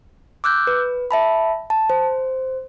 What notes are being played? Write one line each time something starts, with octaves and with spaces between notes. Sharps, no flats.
D6 E6 F#6 G6
B4
E5 A5 B5
A5
C5